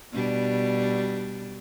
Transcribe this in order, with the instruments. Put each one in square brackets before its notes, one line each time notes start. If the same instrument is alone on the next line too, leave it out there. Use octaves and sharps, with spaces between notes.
[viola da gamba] B2 G3 D4